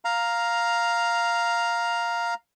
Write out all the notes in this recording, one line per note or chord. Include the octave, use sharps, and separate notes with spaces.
F5 A#5